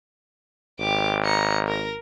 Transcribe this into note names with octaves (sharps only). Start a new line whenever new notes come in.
G#1 G4 D6
A#5 C#7
A#4 A#6